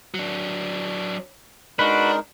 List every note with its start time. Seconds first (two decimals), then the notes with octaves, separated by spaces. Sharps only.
0.14 F#3 D4
1.79 G#3 D4 D#4 F#4 A#4 B4